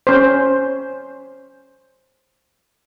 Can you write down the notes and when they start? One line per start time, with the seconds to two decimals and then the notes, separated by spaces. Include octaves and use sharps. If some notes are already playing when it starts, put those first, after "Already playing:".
0.07 C#4 C5